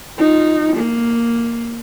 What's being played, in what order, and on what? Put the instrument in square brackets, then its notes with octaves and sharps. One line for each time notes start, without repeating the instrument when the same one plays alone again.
[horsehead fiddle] D#4 F4
A#3